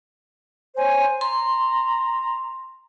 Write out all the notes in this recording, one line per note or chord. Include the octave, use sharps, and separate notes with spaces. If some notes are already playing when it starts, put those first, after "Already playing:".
C5 C#5 G#5
A#5 C6